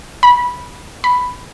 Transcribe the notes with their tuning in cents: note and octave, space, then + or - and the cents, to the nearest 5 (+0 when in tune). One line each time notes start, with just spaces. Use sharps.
B5 -15
B5 +5